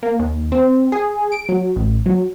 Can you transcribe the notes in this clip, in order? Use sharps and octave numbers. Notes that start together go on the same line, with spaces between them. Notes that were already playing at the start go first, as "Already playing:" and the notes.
A#3
D#2
C4
G#4
D7
F#3
A1
F#3